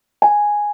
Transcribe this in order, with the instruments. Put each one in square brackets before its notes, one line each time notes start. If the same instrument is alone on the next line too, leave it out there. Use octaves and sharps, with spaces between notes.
[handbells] G#5